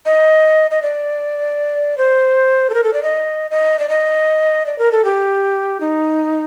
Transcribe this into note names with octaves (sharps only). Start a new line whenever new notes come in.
D#5
D#5
D5
C5
A4
A#4
A4
D5
D#5
D#5
D5
D#5
D5
A#4
A4
G4
D#4